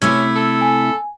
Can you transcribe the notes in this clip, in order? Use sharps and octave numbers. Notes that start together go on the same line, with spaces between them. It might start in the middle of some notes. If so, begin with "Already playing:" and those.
C3 A3 C#4 E4 E6 G#6
A4
G#5